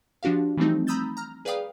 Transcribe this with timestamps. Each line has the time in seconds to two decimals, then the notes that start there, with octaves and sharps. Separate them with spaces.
0.23 F3 D4 F#4 G4 F5
0.57 E3 F3 G3 A3 C4 D#4
0.87 A#5 B5 D#6 E6 G6 A6
1.17 A#5 F6
1.45 G#4 B4 D5 F5 G5 D#6